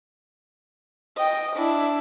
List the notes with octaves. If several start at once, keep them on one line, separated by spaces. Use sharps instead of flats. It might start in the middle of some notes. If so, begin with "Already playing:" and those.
D#5 G5
D4 E4